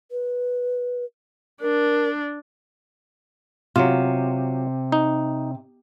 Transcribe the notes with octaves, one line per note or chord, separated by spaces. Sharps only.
B4
D4 A#4
C3 F#3 F4
D#4